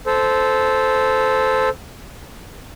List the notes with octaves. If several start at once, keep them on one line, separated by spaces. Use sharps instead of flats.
A4 C5